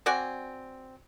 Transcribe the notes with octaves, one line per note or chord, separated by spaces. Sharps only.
C4 F#4 D5 G#5